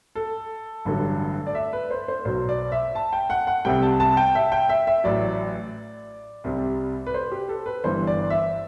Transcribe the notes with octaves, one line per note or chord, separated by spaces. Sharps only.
A4
A1 G2 D3 F#3
D5
E5
B4
C5
C5
B1 B2 F#3 C5
D5
E5
A5
G5
F#5
F#5
C2 C3 G3 G5
A5
A5
G5
E5
G5
E5
E5
A1 A2 F#3 D5
C2 C3 G3
B4
C5
G4
A4
B4
G1 G2 E3 C5
D5
E5